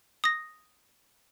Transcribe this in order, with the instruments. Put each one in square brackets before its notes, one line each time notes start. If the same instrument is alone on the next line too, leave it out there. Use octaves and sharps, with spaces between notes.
[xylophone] D#6 A#6